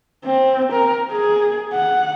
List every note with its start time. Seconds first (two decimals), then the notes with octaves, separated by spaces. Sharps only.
0.25 C4
0.73 A#4
1.12 G#4
1.73 F#5